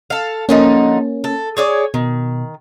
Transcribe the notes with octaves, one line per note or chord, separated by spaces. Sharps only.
A4 F5
D3 F3 A#3 C#4 D#4
A4
G#4 C#5 D5 G#6
B2 D#3